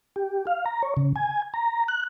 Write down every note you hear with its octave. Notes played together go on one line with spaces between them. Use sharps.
G4
F5
A#5
C#5
C#3
G#5
A#5
F#6